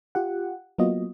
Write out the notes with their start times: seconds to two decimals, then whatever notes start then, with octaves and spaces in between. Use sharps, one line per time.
0.15 F4 G4 F#5
0.78 F#3 A#3 B3 F4 F#4 D#5